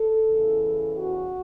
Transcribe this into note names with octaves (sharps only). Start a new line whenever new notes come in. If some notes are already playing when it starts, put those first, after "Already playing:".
Already playing: A4
E2 C#3 E3
F#4